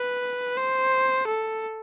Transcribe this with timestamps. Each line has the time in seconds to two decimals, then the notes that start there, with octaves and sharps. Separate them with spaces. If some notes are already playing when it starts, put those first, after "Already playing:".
Already playing: B4
0.57 C5
1.27 A4